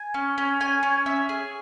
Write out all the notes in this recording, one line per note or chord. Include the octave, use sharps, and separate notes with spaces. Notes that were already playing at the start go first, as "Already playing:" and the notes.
Already playing: G#5
C#4
C#4
C#4 G#5
C#4
C#4 E5
G#4